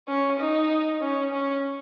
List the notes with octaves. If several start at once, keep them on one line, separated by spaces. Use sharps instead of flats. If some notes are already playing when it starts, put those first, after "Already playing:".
C#4
D#4
C#4
C#4